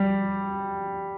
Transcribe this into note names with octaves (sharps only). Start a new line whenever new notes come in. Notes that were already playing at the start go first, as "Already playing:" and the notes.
Already playing: G3